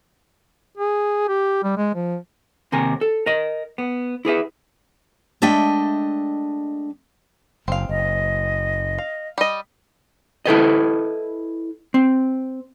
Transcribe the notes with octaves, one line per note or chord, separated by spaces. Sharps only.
G#4
G4
G3
G#3
F3
D#2 C3 A#4 G#5
A4
A#4 D#5
B3
E4 G#4 B4 E5
G#3 A3 D4 D#5 E5 G5
F#1 C4 F5
F#1 D#5
F5
G3 D#5
E4 A4 B4 D#5
C4